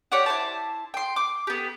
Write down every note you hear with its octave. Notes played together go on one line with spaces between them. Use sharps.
G4 C#5 D5 F#5
E4 C5 A5
G5 C6
D6
B3 G4